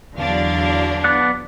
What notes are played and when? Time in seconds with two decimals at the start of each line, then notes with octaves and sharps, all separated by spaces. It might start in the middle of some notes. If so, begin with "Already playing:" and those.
0.16 E2 D3 F#3 D4 F5
1.04 B3 D5 F#5